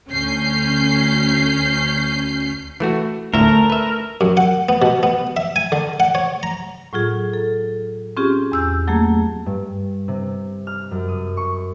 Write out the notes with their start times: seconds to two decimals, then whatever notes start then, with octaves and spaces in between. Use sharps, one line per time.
0.10 D2 C#4 G6 C7
2.80 E3 A3 F#4
3.34 D2 A2 A3 A#4 E5
3.70 B4 E5
4.21 F#2
4.37 F#5
4.69 B3
4.82 B2
5.03 B3
5.37 E5
5.56 G#5
5.72 D3
6.00 F#5
6.15 C#5
6.43 A#5
6.93 A2 F#3 F4 G#4
7.33 A4
8.17 C4 C#4 F4 G4 G#4
8.52 E2 E6 G6
8.88 F#3 A3 A#3 G#4
9.46 G2
10.08 C3
10.67 F6
10.91 F#2
11.08 D#6
11.37 C#6